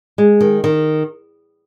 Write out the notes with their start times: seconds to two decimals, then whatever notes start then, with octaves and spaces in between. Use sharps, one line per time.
0.18 G#3
0.41 D#3
0.64 D#3